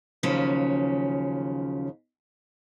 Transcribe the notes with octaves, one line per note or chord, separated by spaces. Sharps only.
D#2 C#3 F3 F#3 C#4